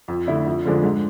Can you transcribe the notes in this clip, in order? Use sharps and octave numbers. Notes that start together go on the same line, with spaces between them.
F2
D3 A3 E4
F2
D3 F3 G#3 D4
G#2